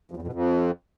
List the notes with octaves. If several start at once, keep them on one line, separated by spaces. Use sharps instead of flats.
F2
E2
F2
B2
F2